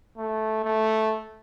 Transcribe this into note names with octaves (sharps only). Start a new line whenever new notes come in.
A3
A3